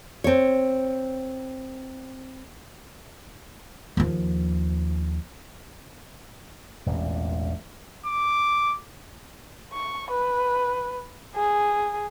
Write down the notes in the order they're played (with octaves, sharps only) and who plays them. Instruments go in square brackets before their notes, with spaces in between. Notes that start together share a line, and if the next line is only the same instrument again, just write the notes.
[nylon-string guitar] C4 C#5
[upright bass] D#2 F3
[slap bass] E1 A1 E2 A#2
[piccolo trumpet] D6
[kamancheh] C#6
B4
G#4